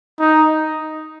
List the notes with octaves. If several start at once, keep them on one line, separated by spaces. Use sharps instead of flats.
D#4